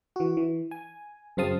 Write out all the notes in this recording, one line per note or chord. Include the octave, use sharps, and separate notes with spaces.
E3 F#4
E3
G#5
F#2 C#3 C4 F5 A5 D#6